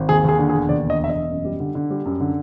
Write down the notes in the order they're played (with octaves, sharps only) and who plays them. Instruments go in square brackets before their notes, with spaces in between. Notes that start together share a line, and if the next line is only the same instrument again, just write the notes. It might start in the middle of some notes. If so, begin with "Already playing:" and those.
Already playing: [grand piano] G#1
D#2 G#4
D#2 G#4
D3
G#4
E1
D#2 D5
D3
D#5
E1 E5
D#5
E1
F#2
G3
D3
D3
G3
F#2
D3